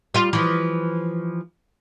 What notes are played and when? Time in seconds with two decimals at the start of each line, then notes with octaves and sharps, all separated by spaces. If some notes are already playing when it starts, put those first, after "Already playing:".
0.14 G3 F4
0.33 E3 F3